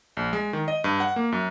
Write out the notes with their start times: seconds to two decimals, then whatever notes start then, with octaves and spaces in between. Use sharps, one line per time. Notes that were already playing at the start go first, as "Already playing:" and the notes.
0.17 A#1
0.33 G#3
0.53 D#3
0.68 D#5
0.84 G2
1.00 F#5
1.16 A#3
1.32 F#2